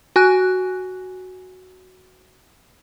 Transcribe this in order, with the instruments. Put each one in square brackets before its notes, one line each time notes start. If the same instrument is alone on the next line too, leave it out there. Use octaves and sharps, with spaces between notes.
[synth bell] F#4 G#5 F#6